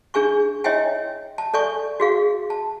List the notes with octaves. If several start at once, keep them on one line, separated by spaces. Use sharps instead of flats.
D4 G#4 G#5 C#6
E4 C#5 D#5 E5 G5 G#5
A5
A4 D5 G#5 C#6
F#4 G#4 F5
A5